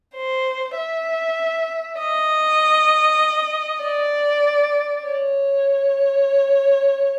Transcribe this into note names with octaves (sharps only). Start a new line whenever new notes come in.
C5
E5
D#5
D5
C#5